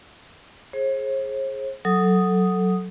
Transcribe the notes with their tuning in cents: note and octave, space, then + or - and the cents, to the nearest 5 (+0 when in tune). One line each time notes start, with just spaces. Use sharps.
G#4 +15 C5 +45
F#3 +0 A4 +0 D#6 +0